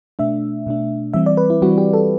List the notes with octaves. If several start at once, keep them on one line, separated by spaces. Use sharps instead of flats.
B2 A3 D4 E5
B2 A3 D4
E3 G3 C4 E5
D5
B4
E4
E3 G3 C4 F#4
G4
A4